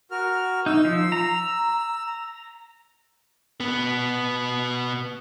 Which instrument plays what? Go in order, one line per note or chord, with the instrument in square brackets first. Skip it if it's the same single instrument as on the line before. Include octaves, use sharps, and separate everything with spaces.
[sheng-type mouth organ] F#4 A#4 F6
[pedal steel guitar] D#4 [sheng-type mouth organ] E6
[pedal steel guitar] F3
A#5
[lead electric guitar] B2 B3